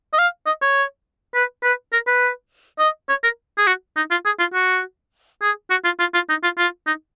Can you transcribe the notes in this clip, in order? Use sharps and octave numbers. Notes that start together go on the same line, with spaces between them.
D#5
F5
D#5
C#5
B4
B4
A#4
B4
D#5
C#5
A#4
G#4
F#4
D#4
F4
G#4
F4
F#4
G#4
F#4
F4
F4
F4
D#4
F4
F4
D#4